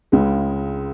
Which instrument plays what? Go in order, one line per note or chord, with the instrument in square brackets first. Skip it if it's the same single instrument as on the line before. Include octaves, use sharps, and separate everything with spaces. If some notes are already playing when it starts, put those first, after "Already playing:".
[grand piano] C#2 C#3 G#3